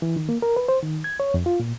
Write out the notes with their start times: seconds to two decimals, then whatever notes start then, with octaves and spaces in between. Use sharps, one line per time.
0.02 E3
0.16 D#3
0.29 A#3
0.42 A#4
0.57 B4
0.68 C5
0.83 D#3
1.04 G#6
1.20 C#5
1.34 F2
1.46 F4
1.60 A#2